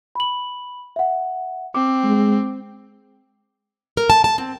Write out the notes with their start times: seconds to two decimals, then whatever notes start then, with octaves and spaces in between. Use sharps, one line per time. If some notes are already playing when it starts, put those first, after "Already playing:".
0.15 B5 F#7
0.96 E5 F#5
1.75 C4 D6
2.04 G#3
3.97 A#4
4.10 A5
4.24 A5
4.38 C4